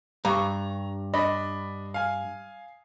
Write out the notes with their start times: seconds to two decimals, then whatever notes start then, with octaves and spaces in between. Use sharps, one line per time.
0.25 G2 A#5 C#6
1.14 D4 D#5 B5
1.94 F5 G#5